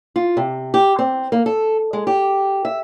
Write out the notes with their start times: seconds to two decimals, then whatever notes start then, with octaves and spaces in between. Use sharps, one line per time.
0.16 F4
0.37 C3
0.74 G4
0.99 C4
1.32 A#3
1.46 A4
1.93 G#3
2.07 G4
2.65 E5